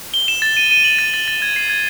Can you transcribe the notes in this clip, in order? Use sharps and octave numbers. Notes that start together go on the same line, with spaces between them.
G7
E7
A6
D#7
D#7
F#7
A6
A6
A6
G#6
C7
G#6